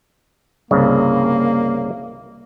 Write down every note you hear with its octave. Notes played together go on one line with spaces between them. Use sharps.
C2 G2 C#3 A#3